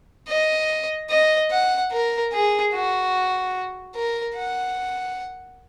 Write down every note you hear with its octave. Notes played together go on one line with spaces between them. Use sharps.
D#5
D#5
F#5
A#4
G#4
F#4
A#4
F#5